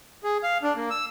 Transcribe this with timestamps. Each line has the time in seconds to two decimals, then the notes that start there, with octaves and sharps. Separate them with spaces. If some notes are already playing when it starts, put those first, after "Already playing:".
0.24 G#4
0.43 F5
0.63 D4
0.76 A#3
0.90 E6